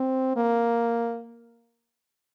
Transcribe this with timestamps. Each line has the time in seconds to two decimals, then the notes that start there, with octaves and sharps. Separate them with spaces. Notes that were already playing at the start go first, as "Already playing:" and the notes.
Already playing: C4
0.37 A#3